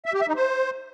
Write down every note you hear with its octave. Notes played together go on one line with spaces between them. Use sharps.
E5
G4
E5
D#4
C5